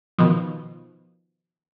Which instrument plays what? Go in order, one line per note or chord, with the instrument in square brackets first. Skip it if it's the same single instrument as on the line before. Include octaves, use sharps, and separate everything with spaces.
[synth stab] B2 D#3 F3